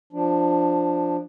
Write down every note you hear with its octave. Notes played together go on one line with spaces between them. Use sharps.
F3 D4